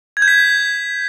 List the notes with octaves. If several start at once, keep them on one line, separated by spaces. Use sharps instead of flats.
G#6
G6
B6